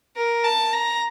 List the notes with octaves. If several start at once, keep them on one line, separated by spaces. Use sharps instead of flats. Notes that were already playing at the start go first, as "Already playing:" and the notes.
A#4
A5
A#5